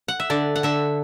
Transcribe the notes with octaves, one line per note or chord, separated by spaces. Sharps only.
F#5
E5
D3 D5
F#5
D3 E5